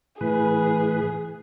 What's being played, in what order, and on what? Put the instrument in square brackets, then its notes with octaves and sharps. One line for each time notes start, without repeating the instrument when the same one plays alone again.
[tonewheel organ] A2 E3 B4 [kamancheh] G#4